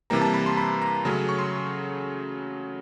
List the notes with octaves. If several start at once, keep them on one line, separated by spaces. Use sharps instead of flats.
C3 E3 G3 A#3 A#5
A5
B5
C6
B5
A#5
C#3 F#3 A3 C#4
C#6
C6